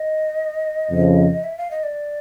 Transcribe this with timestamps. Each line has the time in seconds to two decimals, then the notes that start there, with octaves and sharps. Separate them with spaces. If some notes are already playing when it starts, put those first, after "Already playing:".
Already playing: D#5
0.90 F2 C#3 F3
1.44 E5
1.58 F5
1.71 D#5
1.83 D5